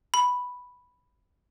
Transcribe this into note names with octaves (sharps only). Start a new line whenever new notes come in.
B5